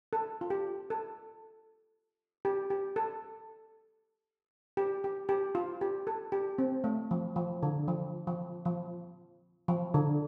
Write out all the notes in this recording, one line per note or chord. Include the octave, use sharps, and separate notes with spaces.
A4
F4
G4
A4
G4
G4
A4
G4
G4
G4
F4
G4
A4
G4
C4
A3
F3
F3
D3
F3
F3
F3
F3
D3